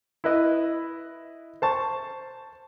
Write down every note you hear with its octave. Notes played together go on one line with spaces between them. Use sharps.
E4 B4 D#5
C5 A5 C#6